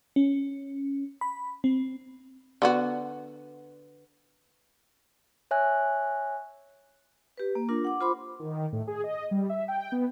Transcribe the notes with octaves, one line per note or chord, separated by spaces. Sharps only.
C#4
B5
C4
D3 B3 F#4
C#5 E5 G#5 F#6
G4 B4
A#3
D4 F4 A#4
F#5 D6
F4 C5 B5 C6 D6
D#3
A2
G#4
D#5
G3
E5
G5
B3